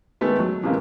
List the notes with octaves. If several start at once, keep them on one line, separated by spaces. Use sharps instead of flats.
D#3 G#3 A3 B3
F#3
A2 C3 E3 G#3 A#3 B3